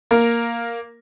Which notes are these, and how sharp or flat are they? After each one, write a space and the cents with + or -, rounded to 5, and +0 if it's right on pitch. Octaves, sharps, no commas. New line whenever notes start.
A#3 +0 A#4 +0